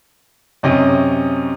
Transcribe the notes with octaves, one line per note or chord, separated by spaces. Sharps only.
F#2 C3 C#4 D#5 D#6